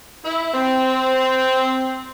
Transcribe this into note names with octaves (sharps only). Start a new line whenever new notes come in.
E4
C4